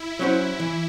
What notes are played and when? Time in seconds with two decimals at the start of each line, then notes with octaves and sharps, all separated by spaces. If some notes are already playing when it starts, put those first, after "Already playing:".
Already playing: E4
0.19 F#3 C#4 F#4 C5
0.60 E3